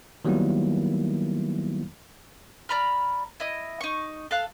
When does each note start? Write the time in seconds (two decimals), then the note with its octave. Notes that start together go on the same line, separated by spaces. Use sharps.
0.25 D#3 F#3 G3 A#3 B3 E4
2.69 D5 A#5 B5 F6
3.40 E4 D#5
3.81 D#4 C#6
4.31 A4 F5 F#6